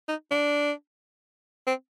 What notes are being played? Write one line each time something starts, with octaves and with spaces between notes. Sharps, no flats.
D#4
D4
C4